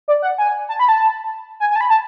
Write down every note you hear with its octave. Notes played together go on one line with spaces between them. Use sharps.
D5
F#5
G#5
A5
B5
A5
G#5
G#5
A5
B5
A5